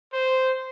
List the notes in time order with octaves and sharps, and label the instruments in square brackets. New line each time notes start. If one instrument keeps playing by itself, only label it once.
[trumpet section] C5